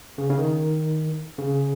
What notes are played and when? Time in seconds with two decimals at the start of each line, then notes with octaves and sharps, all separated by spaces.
0.18 C#3
0.30 C#3
0.38 D#3
1.39 C#3